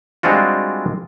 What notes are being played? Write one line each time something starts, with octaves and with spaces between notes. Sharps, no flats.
G3 G#3 C4 D4 F4 F#4